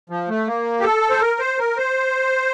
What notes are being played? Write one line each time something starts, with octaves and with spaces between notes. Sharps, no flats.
F3
A3
A#3
G4
A4
C5
A#4
C5
A#4
C5